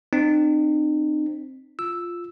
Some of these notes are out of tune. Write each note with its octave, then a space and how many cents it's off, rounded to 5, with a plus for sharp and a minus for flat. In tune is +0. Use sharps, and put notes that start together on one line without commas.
C4 +0 D#4 -40
F4 +0 E6 +0